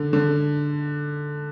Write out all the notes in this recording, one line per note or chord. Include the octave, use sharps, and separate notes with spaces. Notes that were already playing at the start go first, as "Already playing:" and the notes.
Already playing: D3
D3